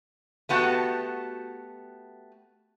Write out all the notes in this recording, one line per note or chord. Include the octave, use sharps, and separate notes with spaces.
A3 B3 F#4 G4 F5 A5